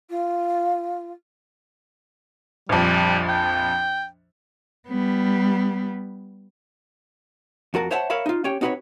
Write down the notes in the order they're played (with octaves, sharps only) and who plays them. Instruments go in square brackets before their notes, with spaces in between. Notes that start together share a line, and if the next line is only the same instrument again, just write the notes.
[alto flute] F4
[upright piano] A#1 F2 [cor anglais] G3
[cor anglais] G5
[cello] G3 B3
[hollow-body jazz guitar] F2 F#4 A#4 A5
C5 C#5 E5 F#5 A5
A#4 C#5 E5 F5 B5
D#4 F4
C#4 G4 C#5 G5
C4 D#4 F#4 A#4 B4 C#5